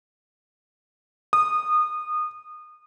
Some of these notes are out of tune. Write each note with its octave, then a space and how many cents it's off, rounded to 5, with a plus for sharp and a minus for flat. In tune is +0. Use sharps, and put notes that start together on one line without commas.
D#6 -25